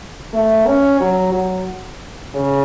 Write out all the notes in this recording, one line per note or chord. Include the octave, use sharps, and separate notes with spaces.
A3
C#4
F#3
F#3
C#3